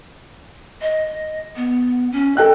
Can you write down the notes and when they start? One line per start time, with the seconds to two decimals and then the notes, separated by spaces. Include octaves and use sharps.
0.82 D#5
1.56 B3
2.12 C#4
2.37 A4 D#5 G5 F#6